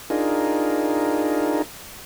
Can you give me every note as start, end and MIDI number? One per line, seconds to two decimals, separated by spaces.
0.10 1.62 62
0.10 1.62 63
0.10 1.62 65
0.10 1.62 68
0.10 1.62 70